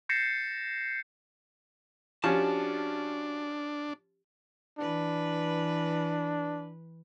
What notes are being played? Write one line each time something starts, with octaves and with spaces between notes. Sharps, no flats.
G6 A6 A#6 C7 C#7 E7
F3 C#4 D4 F#4 G4 A5
E3 D4 B4